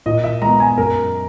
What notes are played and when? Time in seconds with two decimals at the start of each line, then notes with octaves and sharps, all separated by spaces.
0.06 A#2 D#5
0.24 E5
0.42 G#3 B3 A#5
0.60 G#5
0.78 F#2 A#4